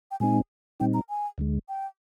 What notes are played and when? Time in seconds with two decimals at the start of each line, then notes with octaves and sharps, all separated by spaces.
0.11 G5
0.20 A#2 G#3 C4 D#4 G#5
0.80 A#2 G3 C4 D#4 G5
0.94 A#5
1.09 G#5
1.38 D2 D3 G#3
1.68 G5